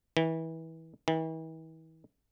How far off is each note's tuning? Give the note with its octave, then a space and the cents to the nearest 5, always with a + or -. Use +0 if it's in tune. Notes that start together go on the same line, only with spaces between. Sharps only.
E3 -25
E3 -40